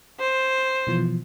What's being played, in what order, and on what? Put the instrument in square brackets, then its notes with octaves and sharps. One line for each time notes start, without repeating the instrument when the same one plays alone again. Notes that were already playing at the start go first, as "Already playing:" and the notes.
[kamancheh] C5
[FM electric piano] B2 E3 F3